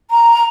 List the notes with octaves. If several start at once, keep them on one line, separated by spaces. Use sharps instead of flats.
A#5